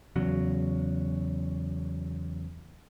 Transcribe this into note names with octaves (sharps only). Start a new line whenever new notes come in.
E2 C#3 F#3